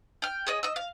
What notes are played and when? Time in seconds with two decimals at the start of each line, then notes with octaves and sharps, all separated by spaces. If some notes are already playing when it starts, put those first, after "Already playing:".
0.22 G5 F6
0.47 G#4 C#5 D#5
0.63 D#5 E6
0.76 F5